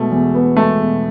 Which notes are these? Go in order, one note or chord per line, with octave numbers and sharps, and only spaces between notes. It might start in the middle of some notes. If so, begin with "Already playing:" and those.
Already playing: B2 G#3 A3
E2
B3
G#3 A3
B2